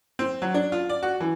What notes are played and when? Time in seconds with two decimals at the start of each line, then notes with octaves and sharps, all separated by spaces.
0.19 C4
0.42 F#3
0.54 D4
0.72 F4
0.89 D5
1.03 F#4
1.20 E3